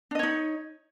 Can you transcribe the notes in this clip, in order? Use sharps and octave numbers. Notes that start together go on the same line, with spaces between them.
D4 D#4 C#5 D#5